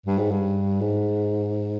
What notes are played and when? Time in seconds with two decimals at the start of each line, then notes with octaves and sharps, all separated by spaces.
0.06 G2
0.19 G#2
0.31 G2
0.81 G#2